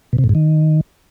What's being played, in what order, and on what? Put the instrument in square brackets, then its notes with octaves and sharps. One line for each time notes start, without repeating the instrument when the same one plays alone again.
[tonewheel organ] B2
C3
A2
G#2
D#3